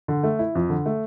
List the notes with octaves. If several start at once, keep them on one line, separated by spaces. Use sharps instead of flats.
D3
A3
E4
F2
D3
A3